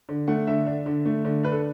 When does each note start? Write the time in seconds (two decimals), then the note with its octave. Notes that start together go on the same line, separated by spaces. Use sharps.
0.09 D3
0.28 A3 F#5
0.47 D3 E5
0.67 D4
0.86 D3
1.06 A3
1.25 D3
1.43 D4 B4
1.52 A4